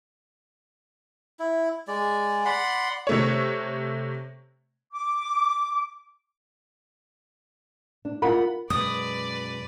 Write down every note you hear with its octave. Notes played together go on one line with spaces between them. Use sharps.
E4
G#3 D5
D5 F#5 B5 C6
C3 A3 C#5
D6
D4
F4 A#4 F#5 B5
F#2 B2 G#3 B4 D5 D#6